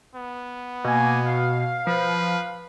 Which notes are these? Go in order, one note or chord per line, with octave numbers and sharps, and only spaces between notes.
B3
B2 A#3 G#5
F5
F3 B4